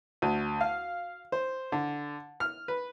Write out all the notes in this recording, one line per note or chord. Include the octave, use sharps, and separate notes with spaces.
D2
F5
C5
D3
F6
B4